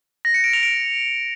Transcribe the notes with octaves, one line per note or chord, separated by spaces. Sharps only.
A#6
C#7
D7
F7
D7